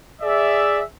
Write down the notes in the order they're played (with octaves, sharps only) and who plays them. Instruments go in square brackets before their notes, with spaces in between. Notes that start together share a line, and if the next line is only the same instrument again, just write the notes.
[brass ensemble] G#4 D5 E5